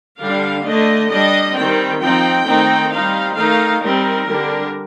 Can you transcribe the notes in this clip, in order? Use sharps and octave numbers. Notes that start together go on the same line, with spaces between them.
D3 G3 D4 F5
D3 A3 D4 D#5
G3 D4 D#5
D#3 G3 C4 G5
F3 C4 D#4 G5
D#3 A3 C4 D#4
G3 C4 D#4 F5
D#3 A3 D#4 F5
G3 C4 D#4 A#4
D3 G3 D4